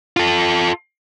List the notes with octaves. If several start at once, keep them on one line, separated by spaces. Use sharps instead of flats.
F4 A4